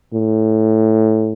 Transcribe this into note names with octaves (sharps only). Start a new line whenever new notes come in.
A2